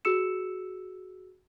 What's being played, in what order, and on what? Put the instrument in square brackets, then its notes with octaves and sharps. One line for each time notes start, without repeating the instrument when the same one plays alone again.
[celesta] F#4 G#4 E6 C#7 E7